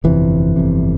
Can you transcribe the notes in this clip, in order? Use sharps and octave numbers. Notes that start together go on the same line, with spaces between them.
G1 F2 C3 E3
G1 F2 C3